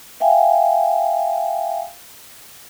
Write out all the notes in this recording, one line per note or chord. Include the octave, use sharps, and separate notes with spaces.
E5 F5 G5 G#5